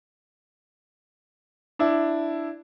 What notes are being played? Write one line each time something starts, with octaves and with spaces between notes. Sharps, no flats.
D4 E4